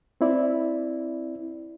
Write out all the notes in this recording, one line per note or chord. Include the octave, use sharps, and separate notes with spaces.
C4 E4 D5